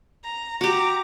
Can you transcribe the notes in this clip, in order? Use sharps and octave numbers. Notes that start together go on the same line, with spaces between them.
A#5
F#4 G4 A#5 D6